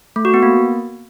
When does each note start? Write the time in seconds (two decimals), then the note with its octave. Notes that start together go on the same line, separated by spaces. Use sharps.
0.16 A3
0.25 F#4
0.34 B3
0.43 A#3